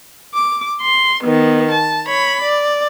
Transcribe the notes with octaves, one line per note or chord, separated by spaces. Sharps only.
D6
C6
D#3 B3
A5
C#5 B5
D5